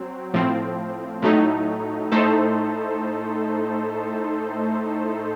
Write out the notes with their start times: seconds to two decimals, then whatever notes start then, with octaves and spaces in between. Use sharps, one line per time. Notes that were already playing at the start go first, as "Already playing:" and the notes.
Already playing: F#3 C4
0.34 A2 F3 C4
1.22 A2 F#3 A3 D#4
2.12 A2 A3 D#4 A4 C5